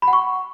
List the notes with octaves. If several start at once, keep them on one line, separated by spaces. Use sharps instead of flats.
B5
F#5
C#6